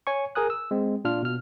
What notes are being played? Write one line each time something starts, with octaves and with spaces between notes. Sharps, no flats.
C#5 G#5 C#6
G#4 A#4 G#5 D#6 F#6
E6
G#3 C4
A#2 D4 F4 F6
B2 F6